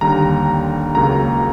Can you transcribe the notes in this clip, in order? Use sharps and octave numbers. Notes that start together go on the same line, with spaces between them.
D#2 D3 G3 A#5
C#2 C#3 F#3 A#3 A#5